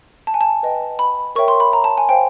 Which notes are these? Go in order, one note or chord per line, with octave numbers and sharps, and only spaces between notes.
A5
G#5
A5
B4 D#5 G5
B5
A#4 C#5 E5 G5 C#6
C6
B5
A#5
A5
G#5
C5 F5 G5